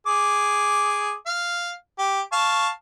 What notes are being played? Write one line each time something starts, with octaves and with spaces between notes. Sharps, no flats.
G#4 D6
F5
G4
F5 A5 C#6